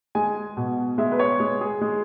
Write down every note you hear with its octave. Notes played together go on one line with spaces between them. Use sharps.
G#3 G#5
B2
G#3 E5
B4
C#5
G#3
G#4
G#3